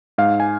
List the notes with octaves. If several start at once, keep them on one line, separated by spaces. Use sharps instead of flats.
G#2 F5
G#5